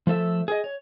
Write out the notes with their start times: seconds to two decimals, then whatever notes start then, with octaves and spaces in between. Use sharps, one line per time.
0.07 F3 A3 A4 E5
0.48 G#4 D#5
0.64 C#5